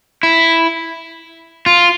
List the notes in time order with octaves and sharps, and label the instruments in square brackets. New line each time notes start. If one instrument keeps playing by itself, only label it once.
[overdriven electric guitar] E4
F4